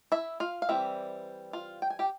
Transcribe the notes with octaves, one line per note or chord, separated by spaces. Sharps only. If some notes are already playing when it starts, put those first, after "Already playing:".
E4 E5
F4 F5
F5
E3 G3 C4 E5
F4 F5
G5
G#5
G4 G5